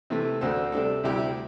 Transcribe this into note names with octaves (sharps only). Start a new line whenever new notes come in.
C3 E3 A3
D2 D3 C4 A4
C3 G3 D4 A4
D2 C3 G3 E4 G4